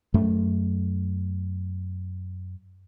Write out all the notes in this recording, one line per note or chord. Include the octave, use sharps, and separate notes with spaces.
F#2 A3